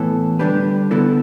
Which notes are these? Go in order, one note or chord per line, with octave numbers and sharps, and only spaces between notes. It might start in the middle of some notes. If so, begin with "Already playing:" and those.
Already playing: A2 E3 B3 E4 A4
D3 G3 D4 G4 B4
D3 B3 E4 A4